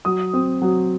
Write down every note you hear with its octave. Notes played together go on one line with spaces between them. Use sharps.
F#3 D#6
C4
F#3